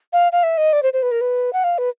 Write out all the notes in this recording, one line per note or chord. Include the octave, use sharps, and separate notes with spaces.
F5
F5
E5
D#5
D5
C5
C5
B4
A#4
B4
F#5
F5
B4